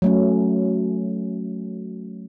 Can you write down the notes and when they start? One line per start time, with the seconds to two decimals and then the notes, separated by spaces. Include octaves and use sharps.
0.02 F#3 A3 C#4